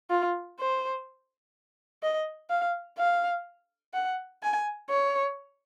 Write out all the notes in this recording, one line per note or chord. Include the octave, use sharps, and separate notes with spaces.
F4
C5
D#5
F5
F5
F#5
G#5
C#5